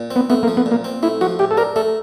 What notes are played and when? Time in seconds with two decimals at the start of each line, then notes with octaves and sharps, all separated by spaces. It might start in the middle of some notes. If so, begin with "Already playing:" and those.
Already playing: A#2
0.11 C4
0.16 B3
0.30 A3 B3
0.43 A#3
0.48 F3
0.57 B3
0.66 A#2
0.71 A#3
0.84 C4
1.03 A3 E4
1.21 F3 F#4
1.39 A2 G4
1.51 A4
1.57 D4 A#4
1.76 A3 A4